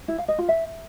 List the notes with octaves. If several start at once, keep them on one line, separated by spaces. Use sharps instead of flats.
E4
F5
D#5
F4
E5